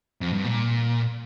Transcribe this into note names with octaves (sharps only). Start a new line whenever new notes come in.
F2
G2
A#2